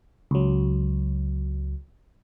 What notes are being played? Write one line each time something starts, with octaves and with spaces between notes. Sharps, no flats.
C#2 F#3